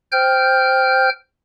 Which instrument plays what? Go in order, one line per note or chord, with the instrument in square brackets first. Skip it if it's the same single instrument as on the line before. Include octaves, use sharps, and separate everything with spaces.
[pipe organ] C5 G5 F6 G6